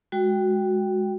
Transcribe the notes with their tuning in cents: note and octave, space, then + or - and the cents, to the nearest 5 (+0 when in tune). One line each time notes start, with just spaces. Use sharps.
G#3 +0 F#4 +0 G5 +0